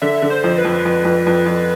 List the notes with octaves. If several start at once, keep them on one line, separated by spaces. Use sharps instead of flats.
D3 E5
D3
C5
F2
B4
F2
F2
F2
F2
F2